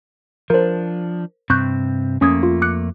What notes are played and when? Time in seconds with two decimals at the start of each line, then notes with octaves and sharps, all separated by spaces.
0.50 F3 D4 A#4 C5
1.50 G2 C3 C4 C#6 F#6 G6
2.21 F2 A3 A#3 C#4 D#6 G#6
2.43 F4
2.62 D6 F#6 C#7